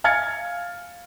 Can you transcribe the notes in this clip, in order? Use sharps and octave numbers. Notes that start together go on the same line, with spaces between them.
F5 G#5 F6 G#6 A6 C#7